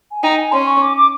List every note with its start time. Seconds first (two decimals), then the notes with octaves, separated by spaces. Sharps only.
0.12 G#5
0.23 D#4 G5
0.38 G#5
0.52 C#4 C6
0.67 C#6
0.82 D6
0.97 D6